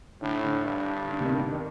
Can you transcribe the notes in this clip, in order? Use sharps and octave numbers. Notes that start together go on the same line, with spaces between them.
A2 D3
D3
G2
D3
C3
D#3
D3
D3
D#3